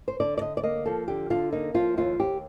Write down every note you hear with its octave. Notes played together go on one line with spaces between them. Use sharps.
C5
D3 D5
D5
D3 D#5
D5
A#3 D#5
F3 A4
D3 G4
D3 F4
A#3 D#4
F3 F4
D#2 F4
D#2 G4